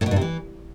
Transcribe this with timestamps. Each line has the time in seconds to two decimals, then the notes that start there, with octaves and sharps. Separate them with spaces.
0.01 A2
0.06 B2
0.11 G2
0.16 C3
0.21 E3